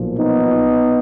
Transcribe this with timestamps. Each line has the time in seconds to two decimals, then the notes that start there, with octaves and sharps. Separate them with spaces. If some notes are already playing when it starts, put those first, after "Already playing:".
Already playing: B1 A#2 F3
0.18 B3 D#4